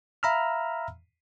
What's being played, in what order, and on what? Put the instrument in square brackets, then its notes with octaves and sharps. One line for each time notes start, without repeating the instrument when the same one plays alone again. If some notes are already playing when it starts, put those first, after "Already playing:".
[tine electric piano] E5 F5 A#5 B5 E6 F6